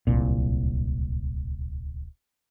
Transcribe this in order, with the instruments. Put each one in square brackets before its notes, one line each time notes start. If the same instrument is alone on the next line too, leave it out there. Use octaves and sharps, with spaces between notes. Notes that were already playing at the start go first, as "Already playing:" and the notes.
[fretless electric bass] D1 C2 A#2